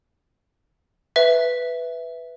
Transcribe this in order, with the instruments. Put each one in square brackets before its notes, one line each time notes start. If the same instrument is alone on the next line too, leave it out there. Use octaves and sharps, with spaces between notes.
[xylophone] B4 E5